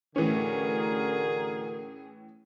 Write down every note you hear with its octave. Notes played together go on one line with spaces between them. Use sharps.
A2 D3 E3 C#4 F#4 G#4 A#4